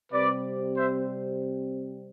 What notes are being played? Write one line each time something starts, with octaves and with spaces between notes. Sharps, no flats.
C3 G3 C4 B4 D5
C5 E5